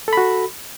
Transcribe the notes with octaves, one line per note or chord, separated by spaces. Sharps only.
F#4 A4 B5